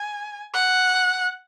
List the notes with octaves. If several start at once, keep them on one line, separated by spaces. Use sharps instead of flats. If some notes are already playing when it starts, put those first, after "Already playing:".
Already playing: G#5
F#5